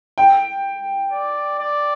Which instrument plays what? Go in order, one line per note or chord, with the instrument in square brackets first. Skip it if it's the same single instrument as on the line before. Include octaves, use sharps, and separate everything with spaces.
[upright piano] G5
[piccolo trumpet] D5
D5